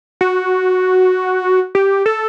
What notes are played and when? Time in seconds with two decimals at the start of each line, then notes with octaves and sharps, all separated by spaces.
0.21 F#4
1.75 G4
2.06 A4